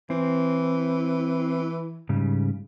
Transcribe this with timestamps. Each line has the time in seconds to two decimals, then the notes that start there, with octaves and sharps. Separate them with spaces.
0.10 E3 C4
2.09 G#2 C#3 G3